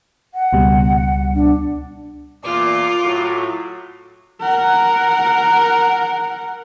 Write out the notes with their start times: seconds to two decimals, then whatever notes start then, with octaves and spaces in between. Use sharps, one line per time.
0.34 F#5
0.53 C#2 B2 G3
1.35 D4
2.44 E2 A#2 F4 D6
3.04 A2 F#3
4.41 A#4 F#5